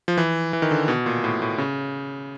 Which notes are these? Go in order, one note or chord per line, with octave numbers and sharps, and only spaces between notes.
F3
E3
E3
D#3
D3
B2
A#2
A2
A2
C#3